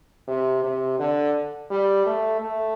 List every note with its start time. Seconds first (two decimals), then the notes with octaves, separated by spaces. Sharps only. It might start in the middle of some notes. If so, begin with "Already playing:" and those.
0.28 C3
0.63 C3
0.99 D3
1.71 G3
2.06 A3
2.41 A3